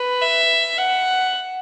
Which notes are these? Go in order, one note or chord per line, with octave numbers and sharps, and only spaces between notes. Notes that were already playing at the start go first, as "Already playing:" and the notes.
Already playing: B4
E5
F#5